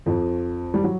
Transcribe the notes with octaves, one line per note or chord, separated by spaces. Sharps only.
F2 F3
G3
F#3